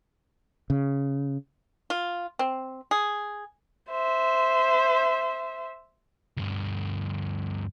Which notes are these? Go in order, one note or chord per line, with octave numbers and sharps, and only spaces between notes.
C#3
F4
C4
G#4
C5 E5
D2 G2